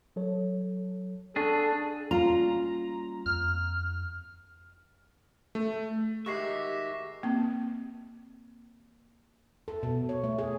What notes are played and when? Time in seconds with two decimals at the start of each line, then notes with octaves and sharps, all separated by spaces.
0.16 F#3 A4 C#5
1.36 D4 G#4 A4 F#5 C#6
2.11 G3 A#3 C#4 F4 A#5
3.26 F2 F6
5.55 A3
6.26 D#3 G#3 F#4 G4 E5 C#6 A#6 C7
7.23 A#3 C4
9.68 A4
9.83 B2
10.09 C#5
10.24 A3
10.39 G#4